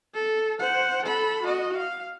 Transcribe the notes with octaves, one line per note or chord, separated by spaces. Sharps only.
A4
C5 F#5
A4 B5
F#4 D#5
F5